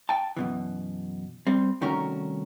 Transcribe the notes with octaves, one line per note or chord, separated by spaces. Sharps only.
G5 A5
F#2 B2 E3
G3 C4
C2 D#3 A3 C#4 F#4 A#4